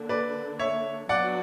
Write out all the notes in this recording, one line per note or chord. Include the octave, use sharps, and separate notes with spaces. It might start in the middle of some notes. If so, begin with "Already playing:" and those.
Already playing: D3 A#3 D4
B4 D5
C#5 E5
F#3 B3 D4 F#4 B4 D5 F#5